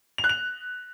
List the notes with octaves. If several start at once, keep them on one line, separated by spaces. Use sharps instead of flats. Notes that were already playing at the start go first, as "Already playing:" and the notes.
F7
F#6
F7